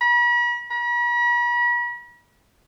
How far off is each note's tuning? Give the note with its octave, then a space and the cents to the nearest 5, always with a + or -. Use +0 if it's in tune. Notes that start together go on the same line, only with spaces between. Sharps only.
B5 -45
B5 -45